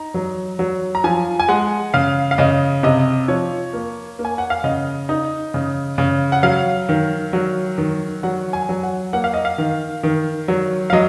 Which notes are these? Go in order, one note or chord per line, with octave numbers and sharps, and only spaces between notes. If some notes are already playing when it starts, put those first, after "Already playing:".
Already playing: D#4 A#5
F#3
F#3
A#5
F3 G#5
G#5
G#3 F#5
C#3 F5
F5
C#3 D#5
C3 D#5
F3 C#5
A#3
A#3
G#5
F#5
F5
C#3 D#5
D#4
C#3
C#3
F#5
F#3 F5
D#3
F#3
D#3
F#3 F#5
G#5
F#3
F#5
A#3 F#5
F5
D#5
F5
D#3
D#3
F#3
F5
F#3 D#5